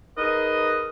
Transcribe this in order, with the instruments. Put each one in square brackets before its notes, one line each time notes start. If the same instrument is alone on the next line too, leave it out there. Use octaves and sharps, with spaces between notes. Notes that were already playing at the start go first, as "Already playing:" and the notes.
[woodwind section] D#4 G#4 A#4 B4 D#5